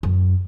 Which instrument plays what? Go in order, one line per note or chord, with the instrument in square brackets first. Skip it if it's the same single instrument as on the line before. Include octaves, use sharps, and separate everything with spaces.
[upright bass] F#2